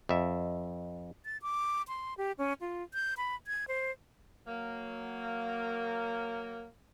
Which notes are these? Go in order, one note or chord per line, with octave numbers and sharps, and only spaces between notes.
F2 E5
A6
D6
C6
G4
C#4
F4
G6
B5
G#6
C5
F#3 A#3